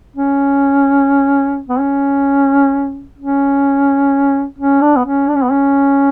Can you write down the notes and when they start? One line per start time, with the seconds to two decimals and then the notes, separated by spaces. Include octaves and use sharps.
0.16 C#4
1.69 B3
1.79 C#4
3.18 C#4
4.58 C#4
4.81 D4
4.96 B3
5.05 C#4
5.28 D4
5.36 C#4
5.44 B3
5.51 C#4